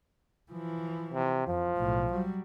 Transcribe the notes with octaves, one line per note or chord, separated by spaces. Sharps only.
E3 F3
C3
F2 F3
B1 A2
F#3 G3